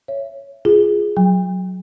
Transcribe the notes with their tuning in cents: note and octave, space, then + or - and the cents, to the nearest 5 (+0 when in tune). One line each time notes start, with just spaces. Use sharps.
C#5 +0 E5 +20
F4 +0 G#4 +0
F#3 +0 G5 +40